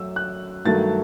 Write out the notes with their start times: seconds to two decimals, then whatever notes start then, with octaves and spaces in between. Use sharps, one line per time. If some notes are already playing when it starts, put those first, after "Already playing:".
Already playing: F#2 F#3 A3 E6
0.16 F#6
0.65 G2 D#3 F#3 A3 A6